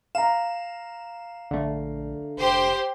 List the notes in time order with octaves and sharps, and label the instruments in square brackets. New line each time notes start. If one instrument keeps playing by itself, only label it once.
[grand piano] F5 A#5 [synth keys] E7
[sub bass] A#1 [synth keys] D3 A3
[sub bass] F1 [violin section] G4 C5 C6